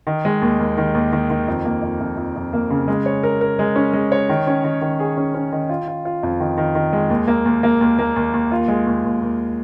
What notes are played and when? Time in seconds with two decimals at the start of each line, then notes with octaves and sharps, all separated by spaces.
0.07 D#3
0.25 G#3
0.42 D#2
0.60 D#2
0.77 D#3
0.94 D#2
1.13 D#3
1.30 D#3
1.48 F2
1.65 A#3
1.82 F2
2.00 F2
2.17 F2
2.36 F2
2.53 A#3
2.70 C#3
2.88 G#3
3.06 C#5
3.23 A#4
3.41 A#4
3.59 G#3
3.76 C#4
3.93 G#3
4.12 C#5
4.29 D#3
4.47 C#4
4.64 D#3
4.82 D#3
5.00 G#4
5.17 C#4
5.34 C#4
5.52 D#3
5.69 F4
5.88 F4
6.05 F4
6.23 F2
6.40 D#3
6.58 D#3
6.75 D#3
6.93 G#3
7.10 D#2
7.28 A#3
7.46 D#2
7.63 A#3
7.81 D#2
7.99 A#3
8.16 D#2
8.34 D#2
8.51 F4
8.68 G#3
8.87 D#2
9.04 D#2
9.22 D#2